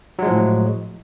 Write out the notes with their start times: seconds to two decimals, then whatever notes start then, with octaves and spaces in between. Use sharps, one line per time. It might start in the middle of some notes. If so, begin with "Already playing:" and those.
0.19 F#3
0.23 G#3
0.26 F3
0.30 A2